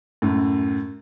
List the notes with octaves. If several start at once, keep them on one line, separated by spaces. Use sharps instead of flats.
F#2 A2